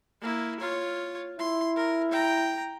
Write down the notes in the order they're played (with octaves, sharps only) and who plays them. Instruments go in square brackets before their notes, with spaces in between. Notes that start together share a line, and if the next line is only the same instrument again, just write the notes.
[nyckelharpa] A#3 E4
F4 C#5
[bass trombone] E4 [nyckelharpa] C6
[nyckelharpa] A#4
G5 A#5